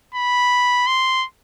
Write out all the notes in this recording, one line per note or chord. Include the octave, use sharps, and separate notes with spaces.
B5
C6